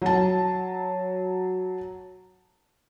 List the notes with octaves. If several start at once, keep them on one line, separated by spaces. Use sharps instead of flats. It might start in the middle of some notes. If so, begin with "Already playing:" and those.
F#3 A5